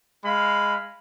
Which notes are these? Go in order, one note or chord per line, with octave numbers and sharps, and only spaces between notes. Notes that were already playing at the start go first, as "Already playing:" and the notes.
G#3 F5 B5